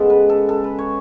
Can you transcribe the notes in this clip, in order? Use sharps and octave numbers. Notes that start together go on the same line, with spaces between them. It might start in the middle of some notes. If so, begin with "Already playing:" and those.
Already playing: C#3 G#3 B3 A4
B4
A4
A4
B4
C#5